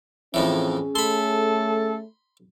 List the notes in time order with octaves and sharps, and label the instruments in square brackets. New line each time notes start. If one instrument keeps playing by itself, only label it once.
[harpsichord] F2 A2 E3 [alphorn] C4 [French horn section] C#4 G#4
[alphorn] A3 [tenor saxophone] A4 [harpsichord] B5 C6